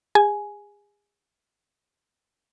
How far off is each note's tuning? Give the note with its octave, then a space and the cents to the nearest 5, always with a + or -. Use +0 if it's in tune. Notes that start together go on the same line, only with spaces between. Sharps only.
G#4 -35 G#5 +10